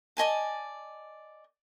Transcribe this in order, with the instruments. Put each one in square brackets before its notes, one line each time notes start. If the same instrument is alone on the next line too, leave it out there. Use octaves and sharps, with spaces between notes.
[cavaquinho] D5 D#5 G#5 A5